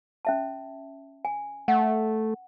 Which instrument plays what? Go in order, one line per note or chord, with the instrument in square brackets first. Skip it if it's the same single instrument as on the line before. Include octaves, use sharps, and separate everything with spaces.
[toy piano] C#4 E5 A5
G#5
[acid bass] A3 [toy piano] F#5